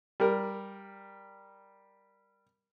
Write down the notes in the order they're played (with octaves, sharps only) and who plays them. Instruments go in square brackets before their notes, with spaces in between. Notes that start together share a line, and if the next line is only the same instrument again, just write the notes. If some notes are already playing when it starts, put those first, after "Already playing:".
[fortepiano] G3 A#4